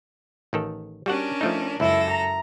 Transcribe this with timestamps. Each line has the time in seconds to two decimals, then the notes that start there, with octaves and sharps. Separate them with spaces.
0.53 A1 D#3 A4
1.06 G3 C#4 D4 F#4 A#4 F#5
1.41 F3 A3 D#4
1.80 C#2 F#2 E4 A4 A#6
2.11 A#5